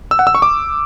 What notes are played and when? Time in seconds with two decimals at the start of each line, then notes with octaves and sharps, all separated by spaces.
0.11 E6
0.19 F#5
0.27 E6
0.35 C#6
0.42 D6